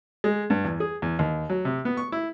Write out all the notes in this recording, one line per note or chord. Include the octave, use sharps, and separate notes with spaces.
G#3
G2
E2
G#4
E2
D#2
F#3
C3
B3
C#6
E4